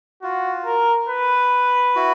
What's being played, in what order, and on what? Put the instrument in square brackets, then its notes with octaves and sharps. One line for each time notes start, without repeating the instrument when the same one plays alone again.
[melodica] F4 [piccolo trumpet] F#4
[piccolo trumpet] A#4
B4
[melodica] E4 F#4